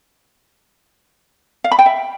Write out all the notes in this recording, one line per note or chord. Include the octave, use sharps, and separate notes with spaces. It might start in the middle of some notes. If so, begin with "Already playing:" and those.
F5
B5
G5
E5